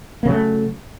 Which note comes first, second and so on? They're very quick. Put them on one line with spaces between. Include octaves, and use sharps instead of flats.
A#3 C#3 F#3 A3